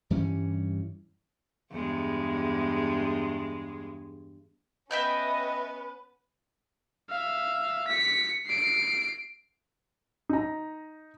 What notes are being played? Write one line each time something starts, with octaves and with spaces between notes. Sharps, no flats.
G2 E3 G3 C#4
E2 G2 G#3
B3 C#4 B4 D#5 E5 G5 G6
E5 F5
B6 C#7
C7 D7
D#4 A#5